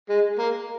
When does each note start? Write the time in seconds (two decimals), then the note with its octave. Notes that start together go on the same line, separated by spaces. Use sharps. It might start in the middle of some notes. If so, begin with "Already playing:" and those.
0.09 G#3
0.39 A#3